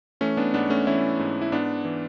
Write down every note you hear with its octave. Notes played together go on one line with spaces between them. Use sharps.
E3 A3 C#4
B3 D4
G#2 B3 D4
A3 C#4
E3 C#4 E4
G#2
E4
G#2 B3 D4
E3